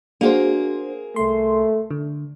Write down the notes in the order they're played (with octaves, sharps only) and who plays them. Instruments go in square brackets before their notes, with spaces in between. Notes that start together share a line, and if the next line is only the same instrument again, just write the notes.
[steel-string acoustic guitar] A#3 G#4 [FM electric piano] D4 F#4 C5
[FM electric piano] C2 C6 [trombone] A3
[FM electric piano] D3